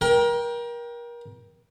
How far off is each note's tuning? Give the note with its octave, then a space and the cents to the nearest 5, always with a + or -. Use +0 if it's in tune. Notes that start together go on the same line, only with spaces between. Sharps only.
A#4 +30 G5 +0